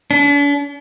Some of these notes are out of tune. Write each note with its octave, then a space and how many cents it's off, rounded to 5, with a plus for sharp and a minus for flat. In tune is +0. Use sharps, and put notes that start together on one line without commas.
D4 -45